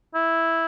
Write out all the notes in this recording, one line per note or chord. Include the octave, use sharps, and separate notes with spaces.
E4